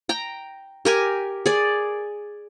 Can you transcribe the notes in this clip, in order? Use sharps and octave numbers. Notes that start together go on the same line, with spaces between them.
G5 A#5
G4 A#4 G#5
G#4 D5